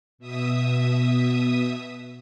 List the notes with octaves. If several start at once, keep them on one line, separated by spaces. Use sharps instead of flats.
B2 E5 D#6